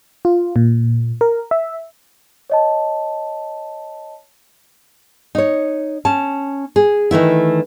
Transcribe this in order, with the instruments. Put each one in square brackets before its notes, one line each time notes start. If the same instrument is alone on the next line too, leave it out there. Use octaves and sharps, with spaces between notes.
[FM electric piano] F4
A#2
A#4
E5
[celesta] C#5 D#5 A5
[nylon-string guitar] D#4 C#5
C#4 A5
G#4
D#3 E3 A3 E4